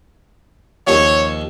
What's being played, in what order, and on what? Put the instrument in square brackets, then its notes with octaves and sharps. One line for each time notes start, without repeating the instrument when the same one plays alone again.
[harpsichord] D#2 F3 [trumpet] C#5